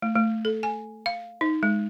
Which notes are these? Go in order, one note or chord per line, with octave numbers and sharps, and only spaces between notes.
A3
A3
A4
G#5
F5
D#4
G#3